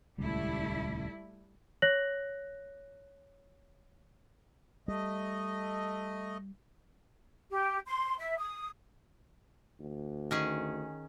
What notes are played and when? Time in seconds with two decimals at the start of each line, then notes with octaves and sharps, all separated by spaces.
0.18 D#1 C#2 G3 A3 E4
1.82 C#5 F#6 A#6 F#7
4.88 G3 A3 D#5
7.51 G4
7.86 C6
8.19 E5
8.38 D#6
9.80 D2
10.31 D#3 C#4 G#4